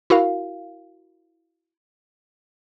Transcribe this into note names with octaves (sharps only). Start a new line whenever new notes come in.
E4 F#4 A#4 F5